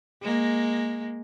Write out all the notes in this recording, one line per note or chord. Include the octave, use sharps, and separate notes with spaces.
G#3 A#3